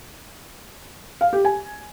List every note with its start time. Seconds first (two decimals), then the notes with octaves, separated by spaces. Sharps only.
1.21 F5
1.33 G4
1.45 G#5